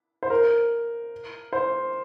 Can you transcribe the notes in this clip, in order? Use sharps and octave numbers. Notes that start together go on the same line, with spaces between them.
C5
A#4
C5